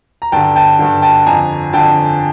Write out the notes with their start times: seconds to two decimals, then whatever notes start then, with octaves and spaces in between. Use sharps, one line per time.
0.22 A#5
0.32 G2 D3 G5 A5
0.56 G5 A5
0.79 G2 D3
1.02 G5 A5
1.26 F2 D3 G#5 A#5
1.73 F2 D3 G5 A5